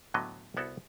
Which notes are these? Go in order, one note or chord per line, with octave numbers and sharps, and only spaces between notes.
A2 D3 F#3 B3 D#5
C2 B3 E4 F#4 A4